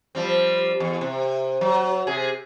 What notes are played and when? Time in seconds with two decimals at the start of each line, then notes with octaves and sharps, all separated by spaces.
0.15 F3 G3 C4
0.80 E2
1.01 C3
1.61 F#3
2.07 C3 G#4